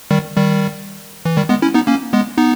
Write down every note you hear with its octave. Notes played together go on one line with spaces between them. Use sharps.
D#3 G3
D#3 G3
E3
D#3 G3
G#3 B3
C#4 E4
B3 D#4
A#3 C#4
G#3 B3
B3 D#4